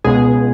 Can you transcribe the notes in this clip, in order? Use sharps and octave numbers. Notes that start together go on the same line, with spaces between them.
C#2 B2 G#3 G#4